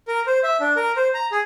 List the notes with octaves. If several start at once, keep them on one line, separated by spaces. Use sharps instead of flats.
A#4
C5
E5
D4
A#4
C5
A#5
G#4